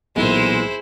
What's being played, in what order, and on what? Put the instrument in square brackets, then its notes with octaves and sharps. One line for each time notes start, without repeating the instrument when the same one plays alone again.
[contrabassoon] B1 [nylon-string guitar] A#2 E3 B3 [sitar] G#3 [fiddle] E4 C5